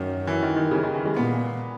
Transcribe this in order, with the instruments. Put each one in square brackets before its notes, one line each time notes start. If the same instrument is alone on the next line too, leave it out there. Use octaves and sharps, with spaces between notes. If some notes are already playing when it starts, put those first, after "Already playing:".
Already playing: [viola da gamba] F#2 [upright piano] D#3
[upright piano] E3
D#3
D#3
C#3
D#3
E3
G#3
[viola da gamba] A#2 [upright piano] B3